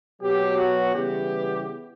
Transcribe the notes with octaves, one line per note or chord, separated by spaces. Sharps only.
B2 F#3 B3 G4
F#4
C#3 E3 G3 B3 G4